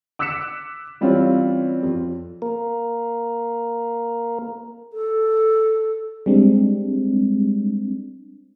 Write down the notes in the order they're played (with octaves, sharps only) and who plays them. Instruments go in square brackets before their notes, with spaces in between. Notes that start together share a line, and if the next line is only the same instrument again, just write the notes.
[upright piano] D6 E6 F#6 B6 C#7 E7
E3 G3 C4 C#4 F4
F2
[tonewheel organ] A#3 A#4
[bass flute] A4
[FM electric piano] G3 G#3 C4 D4